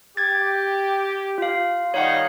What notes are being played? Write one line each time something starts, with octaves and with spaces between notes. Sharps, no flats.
G4 G#6 A6
F4 F5
D#3 G3 D#4 C#5 F5 F#5